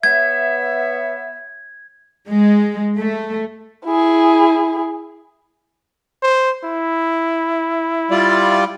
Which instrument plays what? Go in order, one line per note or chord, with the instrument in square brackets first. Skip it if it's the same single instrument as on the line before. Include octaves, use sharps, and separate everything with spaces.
[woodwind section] B3 C#5 E5 [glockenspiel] G#6
[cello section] G#3
A3
[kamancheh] E4 G#4
[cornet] C5
E4
[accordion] G3 F4 D5